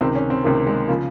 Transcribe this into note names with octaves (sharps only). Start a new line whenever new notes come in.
C#2 C3 D#3 C4
C#4
C4
C#2 C3 D#3 A#3
G#3
C#3 F3 A#3